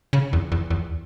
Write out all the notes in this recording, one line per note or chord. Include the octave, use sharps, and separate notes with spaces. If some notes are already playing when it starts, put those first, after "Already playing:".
C#3
E2
E2
E2